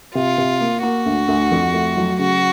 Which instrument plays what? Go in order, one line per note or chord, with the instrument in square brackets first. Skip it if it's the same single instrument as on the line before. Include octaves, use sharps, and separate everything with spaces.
[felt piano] C3 [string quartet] F4
[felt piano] C3
A#3
[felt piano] A#3 [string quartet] F#4
[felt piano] D2
D2
F2
A3
F#3
[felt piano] C#3 [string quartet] F#4